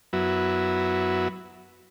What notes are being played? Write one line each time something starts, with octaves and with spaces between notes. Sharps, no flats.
F#2 F#3 B3 E4